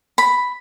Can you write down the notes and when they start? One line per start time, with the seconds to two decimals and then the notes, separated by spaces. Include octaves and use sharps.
0.18 B5